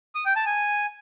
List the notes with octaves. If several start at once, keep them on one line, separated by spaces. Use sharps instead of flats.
D#6
G5
A5
G#5